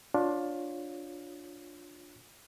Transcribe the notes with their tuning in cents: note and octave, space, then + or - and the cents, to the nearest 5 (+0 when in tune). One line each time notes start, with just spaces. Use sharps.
D4 +0 F4 +20 C#5 -5